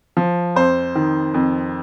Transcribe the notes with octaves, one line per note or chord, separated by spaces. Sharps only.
F3
F2 C5
D#3
F2